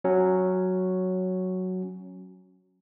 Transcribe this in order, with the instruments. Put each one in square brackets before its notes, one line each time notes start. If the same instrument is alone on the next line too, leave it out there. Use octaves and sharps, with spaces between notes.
[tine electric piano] F#3 C#4